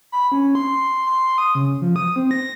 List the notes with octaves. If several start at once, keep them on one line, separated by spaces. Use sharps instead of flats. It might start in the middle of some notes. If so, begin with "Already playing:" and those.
B5
C#4
C6
C6
D#6
C#3
F3
D#6
C4
A#6